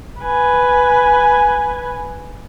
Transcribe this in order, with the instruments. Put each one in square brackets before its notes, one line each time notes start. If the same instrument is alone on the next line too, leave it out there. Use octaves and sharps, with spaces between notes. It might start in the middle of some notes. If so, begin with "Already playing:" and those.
[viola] B4 G#5